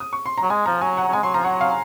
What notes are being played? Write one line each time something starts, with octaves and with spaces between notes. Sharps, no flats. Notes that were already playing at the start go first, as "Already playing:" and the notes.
D#6
C#6
C6
F#3 A#5
G#3 G#5
F3 A#5
F#3 G#5
F#5
F#3
G#3 G#5
F#3 C6
F3 A#5
F#3 F#5
F5